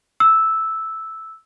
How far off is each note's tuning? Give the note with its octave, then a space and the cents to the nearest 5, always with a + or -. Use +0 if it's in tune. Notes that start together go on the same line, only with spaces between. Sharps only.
E6 -5